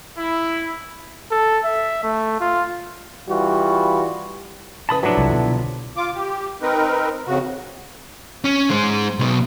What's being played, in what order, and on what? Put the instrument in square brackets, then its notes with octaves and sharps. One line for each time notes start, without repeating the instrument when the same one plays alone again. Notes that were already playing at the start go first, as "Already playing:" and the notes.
[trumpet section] E4
[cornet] A4
E5
A3
F4
[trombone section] E3 G3 F4 F#4
[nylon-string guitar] F2 C#3 B4 [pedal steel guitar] A5 B5 D#6
[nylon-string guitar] C3 F3 B4 [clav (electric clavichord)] F#3 D4 [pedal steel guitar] E4 A4 E5
[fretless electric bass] C2
B2 D3
[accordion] F4 D6
G4
C4 D#4 A#4 B4
F2 C#3 F#4
[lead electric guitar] C#4
G#3 C5
B1 B2